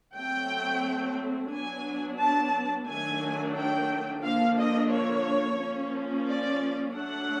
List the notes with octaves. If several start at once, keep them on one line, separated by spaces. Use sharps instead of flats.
F#3 A3 C4 G5
F#3 B3 D4 G#5
A5
D#3 F#3 A3 D4 G#5
G5
D3 F3 A#3 D4 F5
D#5
C#5
F3 A#3 C#4
D5
F#3 A3 D4 F#5